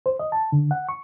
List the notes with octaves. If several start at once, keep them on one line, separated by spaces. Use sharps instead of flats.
C5
D#5
A5
D3
F#5
C#6